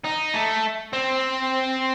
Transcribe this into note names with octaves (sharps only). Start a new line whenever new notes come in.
D#4
A3
C4